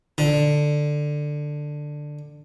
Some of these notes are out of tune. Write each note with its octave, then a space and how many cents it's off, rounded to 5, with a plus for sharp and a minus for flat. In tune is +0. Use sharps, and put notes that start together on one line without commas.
D3 +10